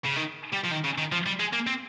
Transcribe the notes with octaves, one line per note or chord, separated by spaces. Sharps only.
C#3
D#3
G3
F3
D#3
C#3
D#3
F3
G3
G#3
A#3
C4